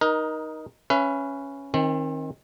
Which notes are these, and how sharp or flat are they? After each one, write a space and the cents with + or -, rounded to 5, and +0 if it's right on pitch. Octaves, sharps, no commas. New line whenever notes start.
D#4 +0 A#4 +25
C#4 +0 B4 +0 E5 +40
D#3 +15 C4 +40